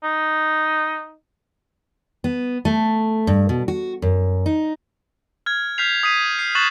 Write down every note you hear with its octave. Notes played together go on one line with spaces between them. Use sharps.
D#4
B3
A3
G2
B2
F#4
F#2
D#4
F6 G#6
F6 G6 B6 C7 F7
D#6 B6 C7 D#7
C7
C#6 F#6 A6 E7 F#7